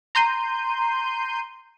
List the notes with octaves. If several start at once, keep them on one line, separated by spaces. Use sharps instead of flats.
A#5 C6 G6 D#7